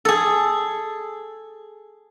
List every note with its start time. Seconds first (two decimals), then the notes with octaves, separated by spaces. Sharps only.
0.05 G#4 A4